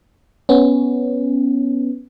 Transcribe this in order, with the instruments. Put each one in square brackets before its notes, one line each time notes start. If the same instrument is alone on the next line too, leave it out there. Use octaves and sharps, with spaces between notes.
[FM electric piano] B3 C#4